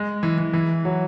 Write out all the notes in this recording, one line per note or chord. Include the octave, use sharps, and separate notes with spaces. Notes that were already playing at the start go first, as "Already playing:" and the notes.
Already playing: G#3
E3
E3
E3
F#3